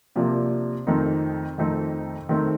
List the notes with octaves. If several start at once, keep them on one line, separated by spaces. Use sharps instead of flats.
C3 F3 A#3 D4
F2 D#3 A3 C4 D#4
F2 D#3 A3 C4 D#4
D#3 A3 C4 D#4